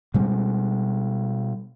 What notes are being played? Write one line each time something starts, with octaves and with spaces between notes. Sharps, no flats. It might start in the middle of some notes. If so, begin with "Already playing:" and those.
B2 G3 G#3